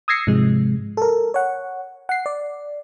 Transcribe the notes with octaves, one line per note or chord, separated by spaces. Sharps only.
D#6 E6 G#6 A#6 C7 C#7
G#2 C3 F3 G#3
A4 A#4
C#5 F#5
F#5 C7
D5